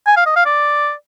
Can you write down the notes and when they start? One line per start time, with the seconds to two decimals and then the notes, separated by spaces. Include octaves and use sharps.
0.07 G#5
0.17 F5
0.26 D#5
0.36 F5
0.46 D5